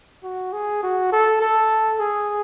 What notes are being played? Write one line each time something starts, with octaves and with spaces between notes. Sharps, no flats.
F#4
G#4
F#4
A4
A4
G#4